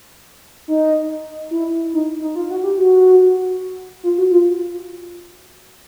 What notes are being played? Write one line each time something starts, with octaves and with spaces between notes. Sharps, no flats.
D#4
E4
D#4
D#4
F4
F#4
G4
F#4
F4
F#4
F4